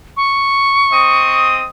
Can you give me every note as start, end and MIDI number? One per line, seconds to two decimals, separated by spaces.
0.17 1.48 85
0.91 1.69 60
0.91 1.69 75
0.91 1.69 87